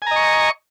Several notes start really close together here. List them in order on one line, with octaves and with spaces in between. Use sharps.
G#5 A#5 D#5 C#6